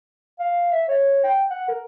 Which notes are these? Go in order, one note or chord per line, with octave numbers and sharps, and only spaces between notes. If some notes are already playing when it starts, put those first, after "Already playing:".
F5
E5
C#5
G5
F#5
A#4